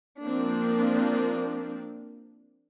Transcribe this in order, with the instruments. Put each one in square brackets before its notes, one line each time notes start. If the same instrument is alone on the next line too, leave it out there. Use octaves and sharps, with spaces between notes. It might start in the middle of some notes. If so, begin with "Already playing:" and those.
[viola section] F3 A#3 C4 D4